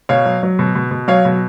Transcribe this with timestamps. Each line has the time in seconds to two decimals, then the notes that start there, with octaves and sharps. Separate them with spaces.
0.09 B2 C#5 F5
0.26 F#3
0.43 F#3
0.59 B2
0.75 B2
0.91 B2
1.08 F#3 C#5 F5
1.25 B2